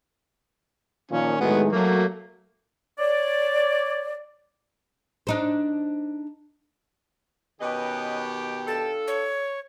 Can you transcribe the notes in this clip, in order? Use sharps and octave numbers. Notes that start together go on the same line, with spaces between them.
A#2 D#3 F3 C#4
A2 D#3 F#3 G#3 B3
F#3 A3 A#3
C#5 D5
D4 D#4 C5
B2 D#3 C#4 G4 B4 D#5
D4 F4 A4 A5
C#5